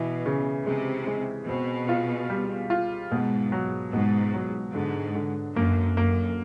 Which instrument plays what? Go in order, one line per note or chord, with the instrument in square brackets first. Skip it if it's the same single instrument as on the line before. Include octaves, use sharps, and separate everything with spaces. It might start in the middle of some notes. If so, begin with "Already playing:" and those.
Already playing: [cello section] B2 [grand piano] E3
[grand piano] C#3
[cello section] C3 [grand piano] G#3
[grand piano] G#3
[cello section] B2 [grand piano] C4
[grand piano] F4
G3
F4
[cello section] G#2 [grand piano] B2
[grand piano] F#3
[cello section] G#2 [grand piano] B2
[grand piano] F#3
[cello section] G#2 [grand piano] D3
[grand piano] D3
[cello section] F#2 [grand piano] A#3
[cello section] F#2 [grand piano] A#3